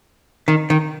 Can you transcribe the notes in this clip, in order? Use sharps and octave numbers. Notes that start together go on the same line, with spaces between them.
D#3
D#3